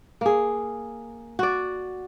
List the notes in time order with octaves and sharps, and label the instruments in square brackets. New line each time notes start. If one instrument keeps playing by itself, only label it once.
[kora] A#3 G#4
F#4 D5